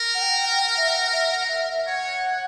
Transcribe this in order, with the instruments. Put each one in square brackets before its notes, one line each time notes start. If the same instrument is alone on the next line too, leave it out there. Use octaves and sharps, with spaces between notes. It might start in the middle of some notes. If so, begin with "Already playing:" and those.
Already playing: [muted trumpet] A#4
[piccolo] F#5
G5
F#5
G5
F#5
E5
F#5
E5
F#5
E5
E5
[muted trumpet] C#5 [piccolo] F#5